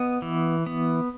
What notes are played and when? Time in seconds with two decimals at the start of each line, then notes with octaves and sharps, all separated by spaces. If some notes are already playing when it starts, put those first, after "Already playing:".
Already playing: B3 D#5
0.22 E3
0.66 B3